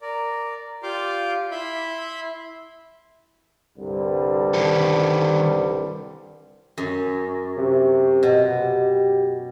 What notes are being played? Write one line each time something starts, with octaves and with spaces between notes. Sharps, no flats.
A#4 D5
F4 G4 D5 F5 C6 D6
E4 E5 B5 C6
C2 G2 D3
D#3 A4
F#2
C3
B2
G4